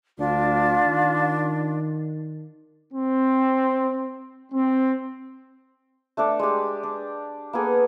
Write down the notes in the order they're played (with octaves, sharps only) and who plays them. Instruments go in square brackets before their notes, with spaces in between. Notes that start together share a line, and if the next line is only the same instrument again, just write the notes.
[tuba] D2 [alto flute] D4 [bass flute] F4
[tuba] D#3
[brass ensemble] C4
C4
[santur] A3 D4 A4 D5
G#3 G4
D4
A#3 B3 G#4 A4